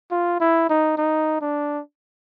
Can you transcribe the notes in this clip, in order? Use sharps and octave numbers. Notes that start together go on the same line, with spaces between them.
F4
E4
D#4
D#4
D4